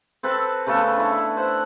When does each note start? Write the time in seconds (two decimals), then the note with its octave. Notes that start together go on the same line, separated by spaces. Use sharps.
0.23 C4 A4 B4
0.67 C#3 A3 B3 A4
0.96 D3 E4
1.37 C5 F#5